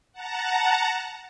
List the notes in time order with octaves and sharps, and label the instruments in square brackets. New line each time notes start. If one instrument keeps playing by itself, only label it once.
[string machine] F#5 A5 A#5